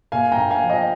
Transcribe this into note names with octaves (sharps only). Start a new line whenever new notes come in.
A#2 F5 G#5
G5 A#5
A#1
F5 G#5
F3
D#5 G5